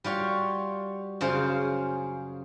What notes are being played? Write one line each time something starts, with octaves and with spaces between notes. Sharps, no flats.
G3 F4 F#4 C#5
F#2 C#3 F4 G#4 C5